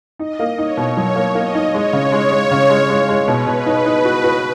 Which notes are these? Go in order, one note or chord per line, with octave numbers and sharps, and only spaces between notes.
D#4 D#5
A#3
D#4 C#5
B2
F#3 C#5
A#3
A#3 D#5
D#4
G#3 C#5
C#3
G#3
G#3
C#3
G#3
G#3
G#3
B2 B4
B2
D#4
D#4
F#4
F#4